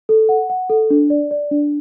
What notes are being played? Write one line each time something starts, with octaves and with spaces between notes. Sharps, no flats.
A4
F#5
F#5
A4
D4
D5
D5
D4